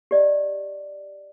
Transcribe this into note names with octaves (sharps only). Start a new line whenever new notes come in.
G4 D5 D#5